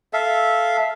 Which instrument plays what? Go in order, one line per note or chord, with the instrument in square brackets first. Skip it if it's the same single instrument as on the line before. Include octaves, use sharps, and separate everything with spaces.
[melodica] A4 E5 F5